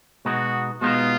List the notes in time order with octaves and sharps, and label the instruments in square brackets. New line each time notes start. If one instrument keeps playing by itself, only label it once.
[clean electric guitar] B2 G#3 B3 D#4 [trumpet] F#4
[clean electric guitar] B2 G#3 B3 D#4 [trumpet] F4